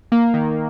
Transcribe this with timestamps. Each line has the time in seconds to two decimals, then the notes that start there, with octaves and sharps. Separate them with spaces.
0.12 A#3
0.34 D#3